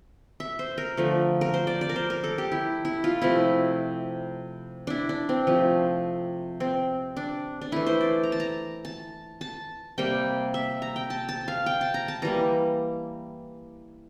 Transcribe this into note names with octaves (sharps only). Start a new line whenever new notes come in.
E5
C5
A#4
D3 F3 A3
A#4
C5
D5
D5
A#4
C5
A#4
A4
G4
E4
E4
F4
C3 F3 A3 E4
D4 E4
D4
C4
C3 F3 A3
C4
D4
D4
E3 A3 E4
C5
D5
A#5
A5
A#5
A5
A5
C3 G3 A#3 G5
E5
A#5
G5
A5
A5
F5
G5
A5
A#5
A5
E3 G3 A#3 A#5